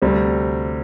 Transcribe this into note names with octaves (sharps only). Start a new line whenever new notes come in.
D2 C3 G3 C4